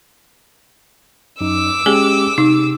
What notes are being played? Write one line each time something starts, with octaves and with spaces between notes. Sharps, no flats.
F#2 D#4 D6 E6
G#3 C#4 G4 G#4 G#5
C3 D#4